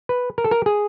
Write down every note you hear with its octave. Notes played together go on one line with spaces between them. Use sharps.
B4
A#4
A4
A#4
G#4